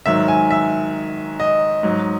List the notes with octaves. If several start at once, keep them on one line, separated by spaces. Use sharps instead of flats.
G#2 D#3 F#3 E5
G#5
E5
D#5
G#2 F#3